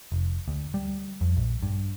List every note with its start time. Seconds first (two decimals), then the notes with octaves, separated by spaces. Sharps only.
0.12 F1
0.48 D2
0.74 G3
1.21 F2
1.37 A#1
1.63 G2